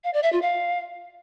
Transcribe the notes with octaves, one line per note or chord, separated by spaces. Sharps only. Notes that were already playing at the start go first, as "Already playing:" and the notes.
F5
D5
E5
F4
F5